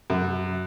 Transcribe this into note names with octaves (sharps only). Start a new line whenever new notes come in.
F#2